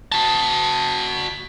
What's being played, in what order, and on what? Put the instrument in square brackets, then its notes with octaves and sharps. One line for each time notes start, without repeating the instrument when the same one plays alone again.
[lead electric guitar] F#4 A5